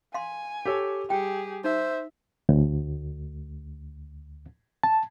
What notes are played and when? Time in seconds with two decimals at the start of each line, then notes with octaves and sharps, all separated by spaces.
0.14 F5 G#5 C6
0.66 G4 A4 C#5
1.10 G3 G4 G#4 G5
1.64 D#4 C5 E5
2.49 D2
4.83 A5